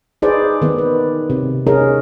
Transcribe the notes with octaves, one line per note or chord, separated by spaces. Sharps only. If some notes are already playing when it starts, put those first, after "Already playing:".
D#4 G#4 B4 C5 D5
D#3 B3
B4
C3
C#4 D#4 G#4 A#4